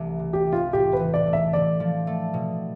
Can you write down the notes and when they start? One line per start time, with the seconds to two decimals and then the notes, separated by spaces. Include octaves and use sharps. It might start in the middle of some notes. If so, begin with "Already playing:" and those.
Already playing: C2 E3 A3
0.19 C3
0.33 G4
0.46 E3
0.53 F4
0.72 A2 G4
0.93 B4
0.99 E3
1.14 D5
1.27 A3
1.33 E5
1.53 D3 D5
1.80 F3
2.07 A3
2.34 B2